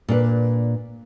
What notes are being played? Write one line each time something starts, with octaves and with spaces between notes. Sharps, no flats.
A#2 D4 B4